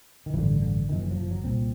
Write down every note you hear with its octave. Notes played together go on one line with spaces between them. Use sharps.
D#3
A1 G2 D3 E3
D3
F#1 F2 C3 D#3
E3
F#3
F3
F#3
C2 A#2 C4